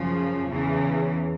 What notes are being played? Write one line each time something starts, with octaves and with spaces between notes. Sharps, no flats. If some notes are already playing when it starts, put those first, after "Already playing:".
Already playing: F#2 C#3 F3
E2 C#3 E3